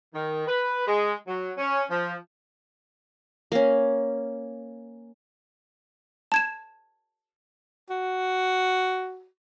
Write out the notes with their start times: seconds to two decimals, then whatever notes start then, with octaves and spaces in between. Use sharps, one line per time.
0.13 D#3
0.47 B4
0.86 G#3
1.26 F#3
1.58 C#4
1.89 F3
3.52 A#3 C#4
6.32 A5 G#6 E7
7.90 F#4